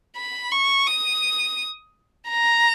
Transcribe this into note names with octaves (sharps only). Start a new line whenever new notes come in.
B5
C#6
D#6
A#5